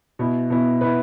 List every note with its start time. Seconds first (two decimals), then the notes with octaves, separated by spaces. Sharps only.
0.19 B2 B3 E4
0.50 B2 B3 E4
0.81 B2 B3 E4 B4